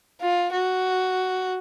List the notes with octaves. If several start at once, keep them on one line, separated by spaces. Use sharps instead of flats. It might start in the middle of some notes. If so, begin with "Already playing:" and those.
F4
F#4